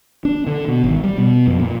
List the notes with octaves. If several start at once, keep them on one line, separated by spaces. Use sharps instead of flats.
D4
D3
B2
G#1
G3
B2
F2
A#2